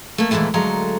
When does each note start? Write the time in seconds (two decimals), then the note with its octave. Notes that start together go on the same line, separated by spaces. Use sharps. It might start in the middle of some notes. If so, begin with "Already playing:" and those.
0.18 A3 A#3
0.31 D#2 A#2 C#3 E3 G#3 A3
0.54 D2 F#3 G#3 A4 F5 A#5